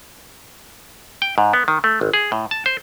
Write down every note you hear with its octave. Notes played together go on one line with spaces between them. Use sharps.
G5
G#2
B3
D#3
A3
G#1
G#4
A2
A5
C5